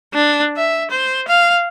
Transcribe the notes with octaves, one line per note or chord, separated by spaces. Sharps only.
D4
E5
C5
F5